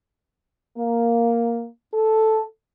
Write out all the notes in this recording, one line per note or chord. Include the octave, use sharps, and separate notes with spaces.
A#3
A4